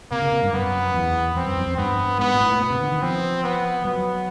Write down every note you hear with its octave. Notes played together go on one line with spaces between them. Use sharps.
C3 A#3
C#3
C3
G2
F#2 B3
E2
F2 C4
F#2
E2
F2
G2 B3
G#2 B3
A#2
A2
A#2 B3
C3
D3
D#3
F3 C4
B3
F#3 B3